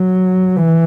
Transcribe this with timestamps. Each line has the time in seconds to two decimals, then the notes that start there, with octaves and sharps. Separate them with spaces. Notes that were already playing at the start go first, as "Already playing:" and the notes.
Already playing: F#3
0.56 E3